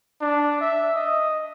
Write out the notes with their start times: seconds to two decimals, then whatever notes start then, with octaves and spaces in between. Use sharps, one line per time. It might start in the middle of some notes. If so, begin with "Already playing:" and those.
0.21 D4
0.61 E5
0.95 D#5